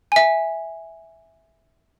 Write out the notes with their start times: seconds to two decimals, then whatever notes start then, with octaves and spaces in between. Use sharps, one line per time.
0.12 E5 G#5